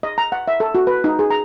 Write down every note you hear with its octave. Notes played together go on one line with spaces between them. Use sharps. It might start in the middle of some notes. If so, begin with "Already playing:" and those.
D#5
A#5
F#5
E5
A4
F#4
B4
D#4
G#4
A#5